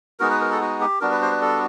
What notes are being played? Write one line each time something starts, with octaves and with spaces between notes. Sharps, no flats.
G#3 B3 D#4 F#4 A#4
B4
A#4
A4
F#4
G4
G3 B3 D4 F#4 A#4
B4
C5
B4
A4